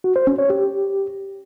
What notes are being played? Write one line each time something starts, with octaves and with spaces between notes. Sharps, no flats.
F#4
C5
C#4
C#5
G4